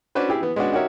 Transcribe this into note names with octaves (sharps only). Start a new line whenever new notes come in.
C#4 D4 F#4 B4 C5
E4 G4 G#4
E3 B3
G#3 B3 C#4 D4 F#4
D#4 F#4 G4 A#4 C#5 E5